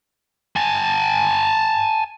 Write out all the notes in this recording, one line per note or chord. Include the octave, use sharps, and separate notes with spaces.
G#5 A5